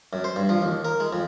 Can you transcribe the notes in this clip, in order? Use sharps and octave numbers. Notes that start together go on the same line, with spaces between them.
F#2
C5
G2
F3
D#2
A#4
G#3
F2